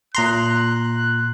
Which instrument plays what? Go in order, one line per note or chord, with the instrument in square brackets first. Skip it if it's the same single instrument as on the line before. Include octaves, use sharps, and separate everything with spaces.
[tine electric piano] A#2 A#5 C6 [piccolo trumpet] F#6